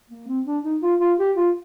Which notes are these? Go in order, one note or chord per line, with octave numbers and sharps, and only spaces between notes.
A#3
C4
D4
D#4
F4
F4
G4
F4